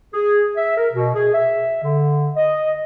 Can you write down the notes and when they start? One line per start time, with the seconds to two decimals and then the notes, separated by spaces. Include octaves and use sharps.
0.14 G#4
0.57 E5
0.77 A#4
0.94 B2
1.15 G#4
1.34 E5
1.84 D3
2.36 D#5